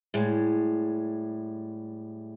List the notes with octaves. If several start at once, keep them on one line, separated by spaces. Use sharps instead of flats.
A2 G3 G#3